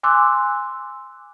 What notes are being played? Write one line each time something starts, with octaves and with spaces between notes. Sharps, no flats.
G#5 C6 D6 E6 F#6